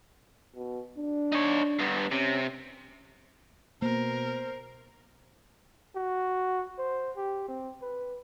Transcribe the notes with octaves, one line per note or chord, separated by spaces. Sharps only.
B2
D4
D#4 C#5
G2 B3
C3 C#4
B2 A#3 A#4 C5
F#4
C5
G4
C4
B4